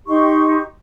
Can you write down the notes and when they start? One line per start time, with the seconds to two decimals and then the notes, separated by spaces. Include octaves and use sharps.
0.06 D#4 G4 C6 C#6